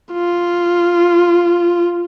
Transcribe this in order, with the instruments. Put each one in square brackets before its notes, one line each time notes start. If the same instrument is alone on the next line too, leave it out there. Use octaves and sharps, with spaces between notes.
[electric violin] F4